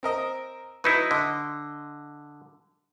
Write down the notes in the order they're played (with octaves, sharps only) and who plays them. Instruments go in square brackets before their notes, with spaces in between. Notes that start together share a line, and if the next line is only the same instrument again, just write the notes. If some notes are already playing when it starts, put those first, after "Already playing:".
[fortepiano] C4 A#4 D#5
[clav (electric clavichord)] F#3 D#4 E4 [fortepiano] B4
[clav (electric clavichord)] D3 [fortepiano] D#5